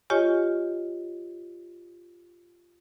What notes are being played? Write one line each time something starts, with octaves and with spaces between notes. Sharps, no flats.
F4 G4 C#5 D#5 G#5 C#6